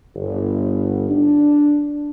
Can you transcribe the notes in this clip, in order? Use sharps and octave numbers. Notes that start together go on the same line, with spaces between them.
G1
D4